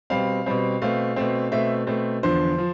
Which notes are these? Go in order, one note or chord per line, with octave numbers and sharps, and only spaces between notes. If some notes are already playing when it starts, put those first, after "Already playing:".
B2 G3 C4 F5
B2 G3 C4
B2 A3 C4 F5
B2 A3 C4
B2 A3 C4 E5
B2 A3 C4
E2 D3 F3 C5
F3